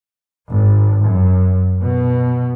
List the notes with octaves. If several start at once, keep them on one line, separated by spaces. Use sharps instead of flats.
G#1
F#2
B2